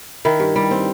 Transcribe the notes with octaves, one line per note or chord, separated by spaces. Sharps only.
D#3 E4
G2
G3
C4